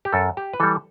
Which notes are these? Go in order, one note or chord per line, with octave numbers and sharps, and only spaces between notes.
G4
F#2 A4
G4
B4
E3 G3 A4